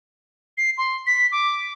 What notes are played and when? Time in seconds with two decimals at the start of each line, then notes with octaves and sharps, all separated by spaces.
0.57 C7
0.78 C6
1.07 B6
1.32 D6